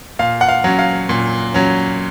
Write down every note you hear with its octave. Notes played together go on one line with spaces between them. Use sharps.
A#2 F5
F#5
F5
F#3 C#4
F5
A#2
F#3 C#4